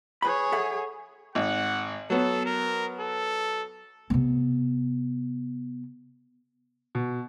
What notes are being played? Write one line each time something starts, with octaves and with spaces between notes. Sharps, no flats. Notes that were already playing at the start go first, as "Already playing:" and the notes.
G#4 B4 C#5 B5
A4 E5 F#5
G#1 F#5
F#3 B3 A4
A#4
A4
C3 B3
B2